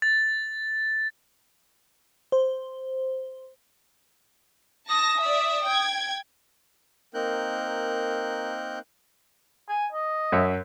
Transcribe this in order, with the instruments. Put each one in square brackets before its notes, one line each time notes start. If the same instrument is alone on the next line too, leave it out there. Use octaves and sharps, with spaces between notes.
[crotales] A6
[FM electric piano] C5
[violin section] A5 A#6 [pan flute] D#6
[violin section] D5 E5
G5 G#6
[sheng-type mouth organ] A#3 C4 D#4 A#4 F#6 G6
[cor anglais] G#5
D#5
[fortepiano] F#2 C#5 E5